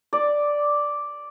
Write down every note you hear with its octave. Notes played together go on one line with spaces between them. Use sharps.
D5